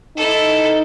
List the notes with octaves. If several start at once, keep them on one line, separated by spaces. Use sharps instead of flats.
D#4 E4 A4